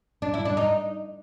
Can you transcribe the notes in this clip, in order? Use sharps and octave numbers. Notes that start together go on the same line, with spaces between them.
D4
E4
D4
D#4